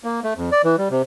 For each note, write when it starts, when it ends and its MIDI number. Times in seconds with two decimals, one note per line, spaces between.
0.04 0.20 58
0.24 0.34 57
0.37 0.50 41
0.52 0.62 74
0.64 0.76 52
0.78 0.88 55
0.91 1.02 48